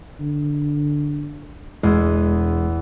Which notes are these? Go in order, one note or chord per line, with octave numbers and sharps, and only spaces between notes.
D3
E1 E2 G#3 D#6